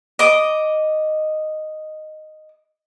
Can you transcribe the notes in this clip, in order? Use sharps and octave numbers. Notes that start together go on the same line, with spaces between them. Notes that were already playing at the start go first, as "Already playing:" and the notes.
D#5 D6